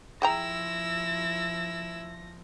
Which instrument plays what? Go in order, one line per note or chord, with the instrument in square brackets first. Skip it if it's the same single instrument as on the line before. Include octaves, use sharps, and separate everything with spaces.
[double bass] F3 [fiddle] E4 E6 [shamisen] G#4 G5 A#5 [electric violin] A#6